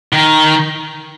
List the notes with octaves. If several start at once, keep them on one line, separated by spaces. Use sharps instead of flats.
D#3